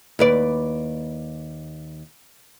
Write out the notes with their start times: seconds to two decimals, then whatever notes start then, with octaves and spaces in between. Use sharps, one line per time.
0.19 D#2 B4 D5